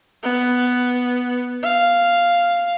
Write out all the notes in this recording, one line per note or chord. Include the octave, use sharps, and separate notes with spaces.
B3
F5